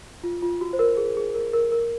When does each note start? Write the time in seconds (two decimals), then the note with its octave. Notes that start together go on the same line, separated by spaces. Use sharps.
0.23 F4
0.42 F4
0.61 F#4
0.73 C5
0.79 A#4
0.97 G#4
1.17 G#4
1.34 A#4
1.53 A#4
1.72 A#4